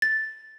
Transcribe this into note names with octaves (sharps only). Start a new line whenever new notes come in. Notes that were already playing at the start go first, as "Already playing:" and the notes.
A6